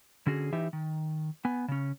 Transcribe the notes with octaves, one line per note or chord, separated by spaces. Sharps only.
D3 C#4 F#4 G#4
E3 D#4 G4 E5
D#3
B3 G#5
C#3 C#4